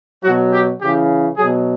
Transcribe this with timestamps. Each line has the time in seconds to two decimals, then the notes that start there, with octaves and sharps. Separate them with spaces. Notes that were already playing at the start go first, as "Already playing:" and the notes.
0.24 F#3 F#4
0.28 B2
0.52 G4
0.81 C#3 E3 G4
1.37 B2 F#3 G#4